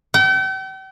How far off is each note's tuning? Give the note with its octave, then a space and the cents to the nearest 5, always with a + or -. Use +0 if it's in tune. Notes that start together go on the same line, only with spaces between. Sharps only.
G5 -40